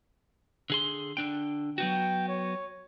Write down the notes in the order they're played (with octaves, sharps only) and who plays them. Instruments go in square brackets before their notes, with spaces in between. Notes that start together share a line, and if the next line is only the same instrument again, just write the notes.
[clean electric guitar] D3 G#4 C6
D3 D4 G5
[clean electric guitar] F#3 B3 F#4 [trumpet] G5
[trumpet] C#5